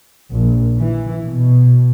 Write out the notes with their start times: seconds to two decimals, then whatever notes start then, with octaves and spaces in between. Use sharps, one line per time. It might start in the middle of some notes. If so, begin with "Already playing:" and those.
0.31 A#1
0.78 E3
1.24 B2